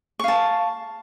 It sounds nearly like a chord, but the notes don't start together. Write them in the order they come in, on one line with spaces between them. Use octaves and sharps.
C#6 F5 A5